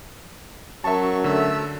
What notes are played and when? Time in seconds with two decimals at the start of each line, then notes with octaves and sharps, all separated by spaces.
0.84 F#3 C#4 F#4 A#4 E5 A5 C#6
1.24 D3 A3 E5 E6